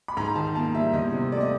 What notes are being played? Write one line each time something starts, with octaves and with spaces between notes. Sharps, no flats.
B5
G#2 A#5
D#3 A5
A#3 A5
G3 E5
E2 D#5
C3
A3 D5
D#5